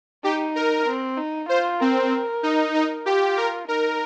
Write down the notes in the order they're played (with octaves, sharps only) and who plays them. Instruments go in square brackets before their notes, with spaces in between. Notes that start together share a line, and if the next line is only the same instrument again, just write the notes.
[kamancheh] D#4 [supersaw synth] G4
[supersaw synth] A#4
[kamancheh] C4
D#4
[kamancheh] F4 [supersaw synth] C5
[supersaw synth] C4 [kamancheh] A#4
[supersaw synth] D#4
[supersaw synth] D#4 [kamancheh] A#4
[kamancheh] F4 [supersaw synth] G4
[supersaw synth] A#4
[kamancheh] D#4 [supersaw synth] A#4